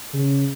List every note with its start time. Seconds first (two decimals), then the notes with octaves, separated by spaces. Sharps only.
0.13 C#3